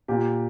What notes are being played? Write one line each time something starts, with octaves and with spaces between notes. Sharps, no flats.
A#2 G4